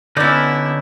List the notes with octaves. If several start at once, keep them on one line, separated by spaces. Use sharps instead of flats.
D3 B3 C#4 D#4 E4 D5